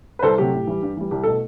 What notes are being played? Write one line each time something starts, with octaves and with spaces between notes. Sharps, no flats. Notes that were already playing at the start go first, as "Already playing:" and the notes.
B4
C2 A4 C5
C3 F#3 A3 G4
A2
E3 G3
G2
E3 G3
C2 G4
B2 A3 A4